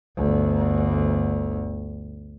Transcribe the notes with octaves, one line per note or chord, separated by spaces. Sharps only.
G1 D2